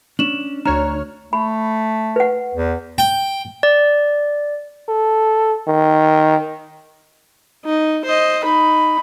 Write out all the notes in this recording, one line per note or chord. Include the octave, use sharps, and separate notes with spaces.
C#4 D4 E7 F#7
D2 D4 C#5 A#5 F6
A3 B5
B4 F#5
E2
G5
D5
A4
D#3
D#4
C5 D#5
D#4 B5